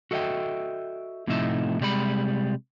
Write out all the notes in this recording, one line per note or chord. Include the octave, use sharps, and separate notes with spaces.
F#4 A4 D#5 E5 G5
A2 C3 F3 A3 D#4 E5
C3 G3 G#3 C#5 B5